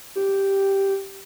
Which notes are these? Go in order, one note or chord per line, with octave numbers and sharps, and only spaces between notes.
G4